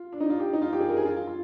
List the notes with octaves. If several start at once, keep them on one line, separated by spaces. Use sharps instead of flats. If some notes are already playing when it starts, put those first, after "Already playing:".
Already playing: F4
D4
D#4
F4
G4
D#4
F4
G4
G#4
A#4
G#4
F4
F4
F4